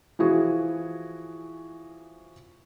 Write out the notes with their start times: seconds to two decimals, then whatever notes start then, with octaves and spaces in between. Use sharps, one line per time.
0.19 E3 F3 E4 F#4 G#4